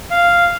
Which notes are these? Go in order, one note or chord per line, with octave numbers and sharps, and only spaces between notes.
F5